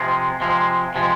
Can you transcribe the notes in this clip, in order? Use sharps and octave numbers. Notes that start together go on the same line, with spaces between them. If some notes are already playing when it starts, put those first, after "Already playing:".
Already playing: C3 F3 G#3
C3 F3 G#3
C3 F3 G#3